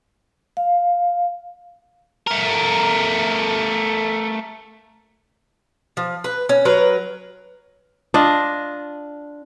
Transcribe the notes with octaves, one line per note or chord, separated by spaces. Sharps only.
F5
A3 A#4
F3
B4
C#4
F#3 A#4 B4
D4 F4 D#5